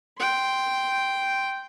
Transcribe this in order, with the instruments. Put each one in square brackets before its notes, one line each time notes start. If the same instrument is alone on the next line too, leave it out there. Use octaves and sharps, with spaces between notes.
[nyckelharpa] G5 C6